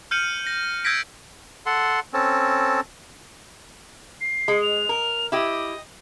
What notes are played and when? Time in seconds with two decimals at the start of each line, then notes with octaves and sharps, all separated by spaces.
0.11 F6 G6 C#7 D#7 F#7
0.47 A#6
0.84 E6 G6 G#6 A#6 B6 D7
1.66 A4 F#5 C6
2.13 C4 C#4 A4
4.21 C7
4.48 G#3
4.62 F7
4.89 A#4
5.32 E4 G4 D#5